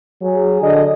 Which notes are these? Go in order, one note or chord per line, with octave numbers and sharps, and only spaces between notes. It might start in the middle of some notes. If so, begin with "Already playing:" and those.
F#3 G#4
D3 D#5